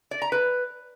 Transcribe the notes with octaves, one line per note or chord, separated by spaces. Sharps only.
D5
A#5
B4